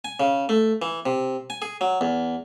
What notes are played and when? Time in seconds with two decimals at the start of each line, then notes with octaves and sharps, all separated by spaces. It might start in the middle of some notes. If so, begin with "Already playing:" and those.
0.05 G#5
0.20 C#3
0.49 A3
0.82 E3
1.06 C3
1.50 G#5
1.62 G#4
1.81 F#3
2.01 E2